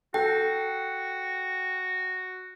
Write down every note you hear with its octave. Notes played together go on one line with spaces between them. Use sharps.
F#4 A4 G5